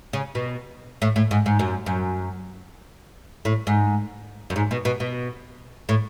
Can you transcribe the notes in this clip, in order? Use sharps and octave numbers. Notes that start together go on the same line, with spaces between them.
C#3
B2
A2
A2
G#2
G#2
F#2
F#2
A2
G#2
F#2
G#2
B2
B2
B2
A2